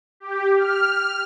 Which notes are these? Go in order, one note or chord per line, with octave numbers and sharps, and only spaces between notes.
G4
F6